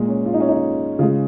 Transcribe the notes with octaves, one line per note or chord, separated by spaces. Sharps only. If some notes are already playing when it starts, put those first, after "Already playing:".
Already playing: A#2 G#3
C#4
F4
D#4
C#4
D#4
C#3 G#3 F4